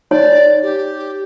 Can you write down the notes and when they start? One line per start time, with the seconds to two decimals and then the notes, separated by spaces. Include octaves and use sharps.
0.11 D#4 C#5 D5 G#5
0.63 G4